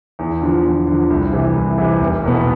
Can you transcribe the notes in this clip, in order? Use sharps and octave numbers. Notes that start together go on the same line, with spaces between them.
E2
D3 F3
E2
D3 F3
C2
C3 E3
C2
C3 E3
F1
E2 B2 B3